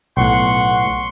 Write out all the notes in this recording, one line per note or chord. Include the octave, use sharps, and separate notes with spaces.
B1 A2 F#5 C6 C#6